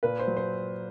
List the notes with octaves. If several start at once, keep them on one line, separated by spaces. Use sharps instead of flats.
A#2 B4
C5
F#3
C5